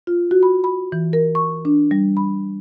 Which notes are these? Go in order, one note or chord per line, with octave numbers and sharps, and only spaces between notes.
F4
F#4
B5
B5
E3
A#4
C#6
D4
G3
B5